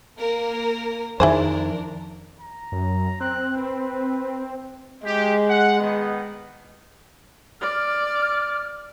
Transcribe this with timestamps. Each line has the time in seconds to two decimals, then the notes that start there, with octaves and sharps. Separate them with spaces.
0.19 A#3 A#4
1.20 F2 D#3 D4 E4 G#4 A#4 C5
2.40 A#5
2.72 F#2
3.20 C4 F#6
3.57 C4 B4
5.06 G#3 G4
5.49 F#5
5.80 D#3 B3
7.61 D5 F6